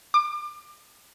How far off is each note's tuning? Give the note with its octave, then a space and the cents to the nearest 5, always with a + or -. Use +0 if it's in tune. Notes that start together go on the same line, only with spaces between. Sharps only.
D6 +35